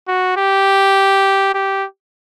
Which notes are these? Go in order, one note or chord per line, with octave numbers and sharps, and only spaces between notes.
F#4
G4
G4